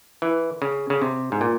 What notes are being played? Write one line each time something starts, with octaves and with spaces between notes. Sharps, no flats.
E3
C#3
C#3
C3
G#2
A#2